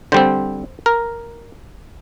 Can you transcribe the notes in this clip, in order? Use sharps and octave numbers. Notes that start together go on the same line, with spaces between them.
D3 G3 C4 C5
A#4